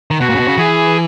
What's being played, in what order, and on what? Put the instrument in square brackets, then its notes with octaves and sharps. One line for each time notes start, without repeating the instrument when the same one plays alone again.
[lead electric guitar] D#3
[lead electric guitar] B2 [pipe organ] F#4
[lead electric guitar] A#2
C#3
B2
C#3
[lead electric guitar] E3 [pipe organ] G#4